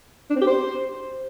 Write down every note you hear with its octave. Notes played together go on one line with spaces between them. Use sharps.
D4
C4
G4
C5